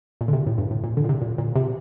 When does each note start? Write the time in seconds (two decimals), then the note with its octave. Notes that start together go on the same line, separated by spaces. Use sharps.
0.21 A#2
0.28 D3
0.33 C3
0.47 A2
0.58 G2
0.71 A2
0.84 A#2
0.97 D3
1.04 A#2
1.09 C3
1.22 A#2
1.38 A#2
1.56 C3